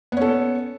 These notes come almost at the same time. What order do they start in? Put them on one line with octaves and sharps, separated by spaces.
B3 C#4 A4